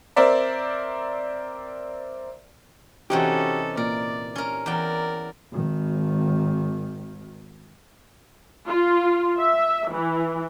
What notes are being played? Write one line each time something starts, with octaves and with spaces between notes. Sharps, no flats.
C4 A#4 C5 D5 E5
C3 E3 C#4 D#4 F#4 G4 A4
A#2 A#4 D5
C#4 A#4
E2 A#4 D5 G5
G#1 D#3
F4
E5
E3